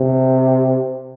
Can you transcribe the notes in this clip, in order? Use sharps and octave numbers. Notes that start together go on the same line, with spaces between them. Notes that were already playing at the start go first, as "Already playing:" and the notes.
Already playing: C3